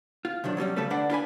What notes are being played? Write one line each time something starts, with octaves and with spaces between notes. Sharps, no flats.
F4
C3 D#3 F#3 D4
F#3 G3 A3 C#4
C#3 G3 A3 C#4 A4 B4
D2 D3 D4 B4 D5 F#5
D4 F4 B4 G#5